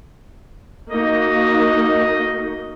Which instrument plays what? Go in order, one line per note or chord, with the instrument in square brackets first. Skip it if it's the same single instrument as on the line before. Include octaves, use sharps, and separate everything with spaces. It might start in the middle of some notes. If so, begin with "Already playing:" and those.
[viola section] A#3 D#4 F#4 [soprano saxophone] D#5